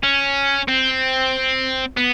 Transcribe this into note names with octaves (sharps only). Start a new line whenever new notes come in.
C#4
C4
B3